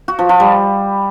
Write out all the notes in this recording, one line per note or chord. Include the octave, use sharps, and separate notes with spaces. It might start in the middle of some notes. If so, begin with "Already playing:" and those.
F#4
F3
F3
G3